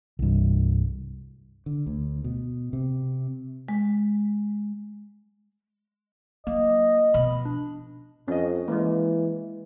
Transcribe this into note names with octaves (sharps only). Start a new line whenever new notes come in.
C2 G2
D3
D2
B2
C3
G#3
F#3 A#3 D#5
B2 F3 B5
D4
F2 C#4 D#5
E3 G#3 A#3